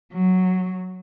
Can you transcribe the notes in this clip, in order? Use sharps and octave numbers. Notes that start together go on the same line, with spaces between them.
F#3